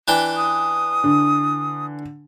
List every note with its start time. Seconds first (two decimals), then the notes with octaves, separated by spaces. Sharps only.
0.08 E3 D4 G5
0.37 D#6
1.04 D3